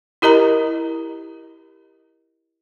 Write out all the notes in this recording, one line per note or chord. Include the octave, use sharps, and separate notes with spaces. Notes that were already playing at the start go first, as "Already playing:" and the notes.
E4 G4 A#4 D#5 A#5